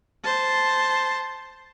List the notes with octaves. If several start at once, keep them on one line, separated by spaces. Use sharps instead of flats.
C5 A5